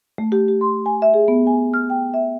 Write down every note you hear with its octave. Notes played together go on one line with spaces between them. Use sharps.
A3
G4
G4
C6
G#5
E5
G#4
B3
G#5
F6
G5
E5